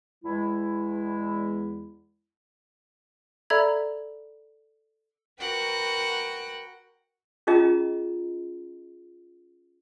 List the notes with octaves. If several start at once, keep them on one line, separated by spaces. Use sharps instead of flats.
E2 G#3 E4
A4 D5 E5 A#5 B5 G#6
F#4 A#4 B4 F#5 G5
C#4 F4 G#4 D#5 A#5